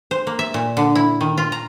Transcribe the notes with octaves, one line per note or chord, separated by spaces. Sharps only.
C5
A#3
E5
A#2
D3
E4
D#3
F4
A#5